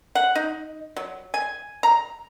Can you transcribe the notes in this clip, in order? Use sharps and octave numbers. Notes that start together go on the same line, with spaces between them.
F#5
D#4
F#3
G#5
A#5